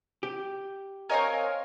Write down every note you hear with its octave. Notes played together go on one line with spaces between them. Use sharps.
G4
C4 A#4 C#5 D#5 F5 G#5